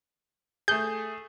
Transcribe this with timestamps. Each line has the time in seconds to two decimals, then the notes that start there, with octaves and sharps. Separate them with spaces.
0.68 A3 G#4 G6